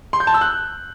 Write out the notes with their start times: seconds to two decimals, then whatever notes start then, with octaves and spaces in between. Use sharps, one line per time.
0.13 C6
0.20 G6
0.27 A5
0.34 E6
0.41 F#6